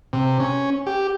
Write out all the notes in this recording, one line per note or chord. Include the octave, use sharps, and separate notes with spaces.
C3
C#4
G4